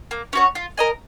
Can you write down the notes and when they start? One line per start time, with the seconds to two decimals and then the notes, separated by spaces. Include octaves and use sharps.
0.11 A#3
0.33 C#4 F#4 C#5
0.55 F4
0.77 A#4 D#5 G#5